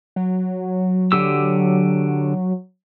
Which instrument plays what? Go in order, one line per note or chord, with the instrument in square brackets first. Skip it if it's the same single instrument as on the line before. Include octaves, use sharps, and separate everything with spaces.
[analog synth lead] F#3
[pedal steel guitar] D3 G4 E6